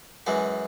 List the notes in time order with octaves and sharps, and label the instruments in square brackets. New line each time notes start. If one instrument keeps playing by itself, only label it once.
[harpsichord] F#2 E3 G#3 F#4